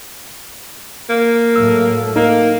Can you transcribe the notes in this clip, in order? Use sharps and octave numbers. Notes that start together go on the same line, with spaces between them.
A#3
A2 F#3 A3 E6
A#3 D#4